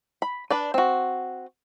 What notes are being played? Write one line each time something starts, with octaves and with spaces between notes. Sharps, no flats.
B5
D4 B4 D5
C4 F#4